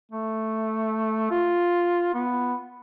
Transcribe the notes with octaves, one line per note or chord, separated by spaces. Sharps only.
A3
F4
B3